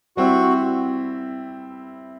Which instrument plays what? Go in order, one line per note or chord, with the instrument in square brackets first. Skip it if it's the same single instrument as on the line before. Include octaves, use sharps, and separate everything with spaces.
[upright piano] G3 C4 E4 [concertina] F#4